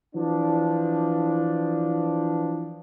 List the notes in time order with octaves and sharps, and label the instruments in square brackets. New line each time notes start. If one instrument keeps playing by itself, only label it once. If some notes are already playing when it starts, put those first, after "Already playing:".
[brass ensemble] E3 F3 D4